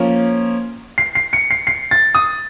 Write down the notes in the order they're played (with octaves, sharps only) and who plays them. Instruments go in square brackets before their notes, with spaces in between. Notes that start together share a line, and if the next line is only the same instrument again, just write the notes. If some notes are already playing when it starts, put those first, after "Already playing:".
Already playing: [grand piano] F3 A#3 C#4
C7
C7
C#7
C7
C7
A6
D#6